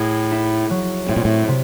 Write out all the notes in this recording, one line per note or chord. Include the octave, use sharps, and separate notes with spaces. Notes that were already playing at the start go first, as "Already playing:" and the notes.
Already playing: A2 G#4
E4
F#3
A2 C4
A#2
A2
C3